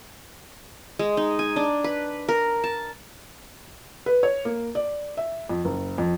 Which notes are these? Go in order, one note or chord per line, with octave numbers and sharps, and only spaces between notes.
G#3
D#4
G#5
D4
B4
A#4
A5
B4
C#5
A#3
D5
E5
F2
F#1
F2